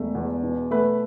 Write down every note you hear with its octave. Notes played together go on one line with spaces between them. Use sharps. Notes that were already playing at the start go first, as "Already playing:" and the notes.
Already playing: E1 A3
E2
B2
A3 B4